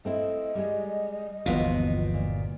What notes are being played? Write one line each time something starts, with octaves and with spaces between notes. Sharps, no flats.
A3 C4 E4 D#5
G3 G#3
G1 D#2 B2 E3 F3 B3 F4
A#2